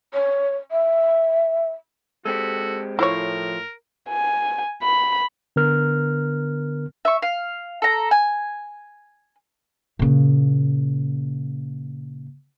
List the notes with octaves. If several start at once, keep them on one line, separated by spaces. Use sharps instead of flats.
C#5
E5
G#3 C4 F#4 G4 A4
A2 F3 E4 A#4 C5 C#5
G#5
B5
D3 B3 A#4 F6
E5 C#6
F5
A4 A#5
G#5
A#2 C#3